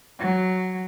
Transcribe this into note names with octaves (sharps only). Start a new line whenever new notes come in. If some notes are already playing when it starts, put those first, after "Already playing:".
F#3